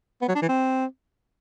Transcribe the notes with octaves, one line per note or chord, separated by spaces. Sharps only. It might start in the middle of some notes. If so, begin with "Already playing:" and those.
B3
F#3
D4
E3
C4